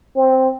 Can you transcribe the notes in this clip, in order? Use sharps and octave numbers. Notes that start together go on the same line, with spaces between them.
C4